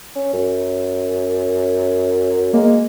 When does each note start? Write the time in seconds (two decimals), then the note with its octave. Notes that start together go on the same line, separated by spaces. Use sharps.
0.15 C#4
0.33 F#2
2.53 G#3 A#3